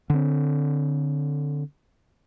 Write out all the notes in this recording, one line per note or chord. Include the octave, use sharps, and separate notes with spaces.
D3 C4